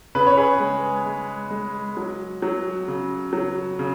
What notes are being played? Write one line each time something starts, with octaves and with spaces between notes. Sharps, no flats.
C#3 B4
C#5
G#4 B4
G#3
G#3
G#3
F#3
F#3
C#3
F#3
C#3